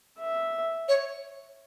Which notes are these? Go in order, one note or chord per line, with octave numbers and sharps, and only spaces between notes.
E5
C#5